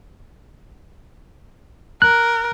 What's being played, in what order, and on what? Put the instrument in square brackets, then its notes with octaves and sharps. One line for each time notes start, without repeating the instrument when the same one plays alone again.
[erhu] A#4 [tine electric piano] F#6